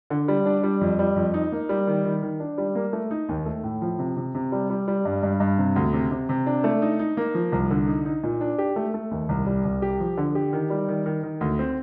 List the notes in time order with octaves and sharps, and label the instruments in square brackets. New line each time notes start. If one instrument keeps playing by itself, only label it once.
[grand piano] D3
G3
D4
G3
F2
G3
F2
D#4
A#3
G3
D#3
D#3
D#3
D4
G3
A#3
A3
D#4
D#2
A3
A2
F3
C3
C3
C3
G3
G3
G3
G2
G2
G2
C3
D2
C3
C3
C3
D4
A3
D#4
D#4
A#3
F3
C2
D3
D#4
D#4
A#2
D4
G4
A3
A3
D#2
C2
G3
C2
G4
F3
D3
G4
D#3
G3
D#3
D#3
D#3
D2
C4